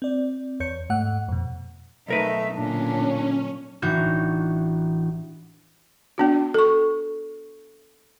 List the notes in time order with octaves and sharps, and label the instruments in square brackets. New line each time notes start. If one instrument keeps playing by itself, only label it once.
[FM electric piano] C4 D5
E2 C#5 G6 C#7
G#2 A3 F#5 F#6
F2 B2
[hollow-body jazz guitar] B1 A#4 B4 [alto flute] A3 [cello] D#4 E5
[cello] A#2 D3 [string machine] C#4 [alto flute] D4
[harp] A1 E3 D4 D#4 F#4 G6
[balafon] B3 D4 F#4
A4 C#6